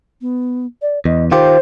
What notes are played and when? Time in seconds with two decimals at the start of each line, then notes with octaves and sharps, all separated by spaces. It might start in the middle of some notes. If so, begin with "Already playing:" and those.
0.21 B3
0.82 D5
1.05 E2 D#5
1.31 D#3 F4 G4 C5